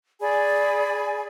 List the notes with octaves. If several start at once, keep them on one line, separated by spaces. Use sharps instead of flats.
G#4 D5 G#5 B5